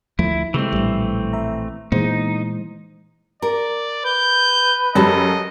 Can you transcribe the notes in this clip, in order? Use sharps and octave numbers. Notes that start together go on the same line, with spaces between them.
D2 F3 A3 E4
C3 E3 G#3 A3 C4
A#1 A2 G3
E5 A#5
A#2 E3 G#3 A#3 B3 D#4 C5
A#4 D5
B4 G6
F#2 F#4 G4 A4 D#5